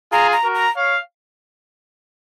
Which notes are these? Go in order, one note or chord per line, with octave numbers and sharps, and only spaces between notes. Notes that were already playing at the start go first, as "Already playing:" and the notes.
F4 G#4 A#5
A#5
F#4 A#4
A#5
C#5 F5